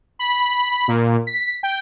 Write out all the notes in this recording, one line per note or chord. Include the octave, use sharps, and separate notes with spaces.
B5
A#2
B6
G5